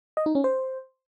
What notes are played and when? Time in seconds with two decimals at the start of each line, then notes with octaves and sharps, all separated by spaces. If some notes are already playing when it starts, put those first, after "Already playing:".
0.17 D#5
0.26 D#4
0.35 C#4
0.44 C5